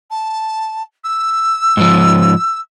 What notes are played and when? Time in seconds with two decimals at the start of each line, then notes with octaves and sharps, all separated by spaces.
0.11 A5
1.04 E6
1.77 G#2 F3